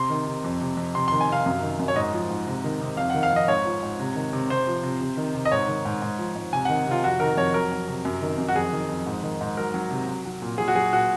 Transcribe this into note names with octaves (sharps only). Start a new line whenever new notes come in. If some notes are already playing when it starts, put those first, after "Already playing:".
Already playing: C3 C6
D#3
C3
F2
C3
F2
C3 C6
D#3 C6
G#5
C3 F5
F#2
D#3
F#2
C#5
G#2 D#5
F3
G#2
C3
D#3
C3
F2 F5
D#3 F#5
F5
F2 D#5
G#2 C#5
F3
G#2
C3
D#3
C3
C3 C5
F3
C3
C3
D#3
C3
D#5
G#2 C#5
D#3
G#2
G#2
F3
G#2
C3 G#5
D#3 F#5
C3 F4
F2 F#4
D#3 A#4
F2 C#5
F#3 A#4
F#3
C3
F#2
D#3
F#2
F#4
F2 G#4
D#3
F2
G#2
D#3
G#2
F#3 A#4
F#3
C3
F#3
F#3
A#2
F#3 G#4
F#4
F#3 G#4
A#2 F#4